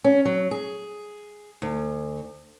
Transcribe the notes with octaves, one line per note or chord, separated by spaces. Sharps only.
C#4
F#3
G#4
D2